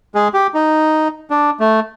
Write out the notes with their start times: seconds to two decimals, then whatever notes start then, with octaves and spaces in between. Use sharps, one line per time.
0.15 G#3 G#4
0.34 G4
0.54 D#4
1.30 D4
1.60 A3